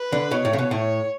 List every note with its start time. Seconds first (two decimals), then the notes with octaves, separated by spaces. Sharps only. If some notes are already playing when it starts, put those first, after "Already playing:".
Already playing: B4
0.12 D3
0.31 B2 C#5
0.45 A2
0.53 C#3
0.58 B2
0.71 A2 C#5